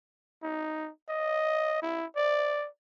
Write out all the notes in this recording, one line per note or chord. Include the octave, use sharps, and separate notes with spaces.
D#4
D#5
E4
D5